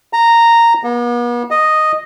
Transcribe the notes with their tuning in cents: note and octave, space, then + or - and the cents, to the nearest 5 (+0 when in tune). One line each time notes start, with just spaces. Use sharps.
A#5 -10
B3 -45
D#5 -5